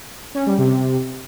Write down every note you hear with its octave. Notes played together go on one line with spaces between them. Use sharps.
C#4
G3
C3